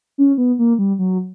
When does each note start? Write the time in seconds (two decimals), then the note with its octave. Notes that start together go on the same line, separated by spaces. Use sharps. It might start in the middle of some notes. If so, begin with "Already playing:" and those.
0.18 C#4
0.38 B3
0.59 A#3
0.79 G3
0.99 F#3